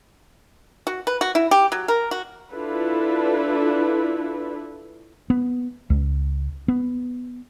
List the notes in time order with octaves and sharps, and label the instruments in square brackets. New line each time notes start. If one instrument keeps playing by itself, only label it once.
[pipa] F#4
B4
F#4
E4
G4
F#3
A#4
F#4
[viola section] D4 E4 F4 A4 B4
[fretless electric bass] B3
C#2
B3